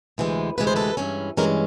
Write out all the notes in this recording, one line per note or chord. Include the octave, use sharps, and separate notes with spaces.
D2 C3 E3 G#3
D2 C3 E3 G#3 B4
C5
A4 B4
G2 E3 G#3 C#4
G2 E3 G#3 C#4 G#4 A#4